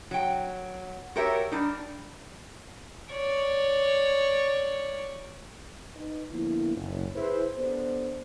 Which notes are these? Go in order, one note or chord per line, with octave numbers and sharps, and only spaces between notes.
F#3 G5
F#4 G4 A#4 C#5 E5
G3 D4 D#4
C#5 D5
D#4 B4
D3 F3 A#3 B3 E4
F#1
E4 G#4 B4 C5
B3 D4 G4 A4 C5